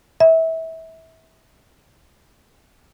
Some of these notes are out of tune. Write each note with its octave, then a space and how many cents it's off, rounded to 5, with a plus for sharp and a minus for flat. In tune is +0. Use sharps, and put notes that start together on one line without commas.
E5 -25